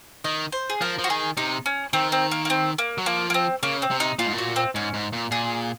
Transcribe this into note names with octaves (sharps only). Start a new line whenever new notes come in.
D#3 D#5
C5
G#4
F3 A#4
F3
F#4
D#3 G#4
C3 D#4
C#4
D#3 C4
C4
A#3
A#3
C4
A#3
F#3
F3 A#3
A#3
C4
C#3 A#3
C4
C3
D#4
A#2 F4
G#2
A#2
F#4
C4
G#2 C#4
G#2
A#2
A#2 G#4